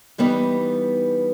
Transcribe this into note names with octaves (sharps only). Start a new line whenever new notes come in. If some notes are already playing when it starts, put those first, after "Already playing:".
E3 G3 B3 D#4